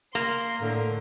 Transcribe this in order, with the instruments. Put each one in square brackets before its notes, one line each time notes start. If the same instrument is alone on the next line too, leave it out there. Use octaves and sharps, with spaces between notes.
[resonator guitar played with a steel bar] A#3 [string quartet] C6
[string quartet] A2 D3